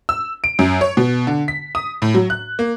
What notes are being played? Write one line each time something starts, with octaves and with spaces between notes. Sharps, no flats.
E6
D7
F#2
C#5
B2
D3
B6
D#6
A2
F#3
F#6
A#3